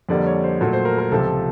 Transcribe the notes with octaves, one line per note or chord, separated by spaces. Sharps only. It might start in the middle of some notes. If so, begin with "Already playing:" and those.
F2 D3 G3 A#3 D5
C#5
C5
A#2 F#3 A3
C5
A#4
A#4
C#2 C3 F3 A4